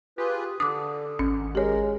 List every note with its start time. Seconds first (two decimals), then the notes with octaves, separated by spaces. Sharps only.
0.18 F4 G4 G#4 B4
0.60 D3 D4 D6 D#6
1.19 G#1 C#4
1.55 G#3 G4 A#4 C#5